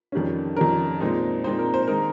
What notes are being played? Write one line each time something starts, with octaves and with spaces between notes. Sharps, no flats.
F2 D#3 G3 C#4
F2 D#3 G3 C#4 A#4
A#2 G#3 C4 D#4
A#2 G#3 C4 D#4 C5
A#4
C5
D#3 G#3 D#4 A#4